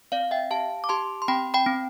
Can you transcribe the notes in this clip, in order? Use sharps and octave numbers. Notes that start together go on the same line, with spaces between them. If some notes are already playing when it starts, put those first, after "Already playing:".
C4 D5 F5
E5 G5
G4 F5 A5
D6
G4 A5 C6
C6
C4 G5 B5
G5 B5
C4